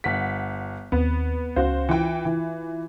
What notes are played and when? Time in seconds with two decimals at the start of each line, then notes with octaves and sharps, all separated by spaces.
0.04 G1 F#5 B6
0.92 D#2 B3 C4
1.56 C#2 C#4 F#4 C5 F5
1.89 E3 F4 G5
2.25 E3